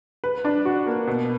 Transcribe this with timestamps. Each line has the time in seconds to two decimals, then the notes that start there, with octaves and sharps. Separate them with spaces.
0.24 B4
0.45 D4
0.65 F#4
0.87 A#3
1.07 B2